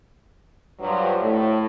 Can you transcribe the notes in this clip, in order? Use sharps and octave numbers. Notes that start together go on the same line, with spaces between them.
G2 F3 F#3
A2